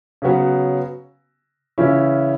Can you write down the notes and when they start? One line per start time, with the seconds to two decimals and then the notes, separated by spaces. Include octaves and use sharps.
0.22 C#3 F#3 B3 F#4
1.78 C#3 E3 C#4 E4